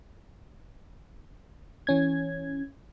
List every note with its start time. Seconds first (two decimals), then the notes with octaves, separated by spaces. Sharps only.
1.87 E3 C#4 G#6